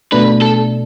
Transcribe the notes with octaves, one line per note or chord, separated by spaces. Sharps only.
B2 A3 D4 B4
A4